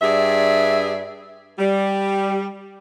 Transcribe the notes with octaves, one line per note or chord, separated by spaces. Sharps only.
G2 G#4 D5 E5
G3